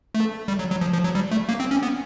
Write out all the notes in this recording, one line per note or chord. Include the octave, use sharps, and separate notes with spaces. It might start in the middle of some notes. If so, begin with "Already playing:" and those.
A3
G3
F#3
F#3
F3
F3
F#3
G3
A3
A#3
C4
C#4
B3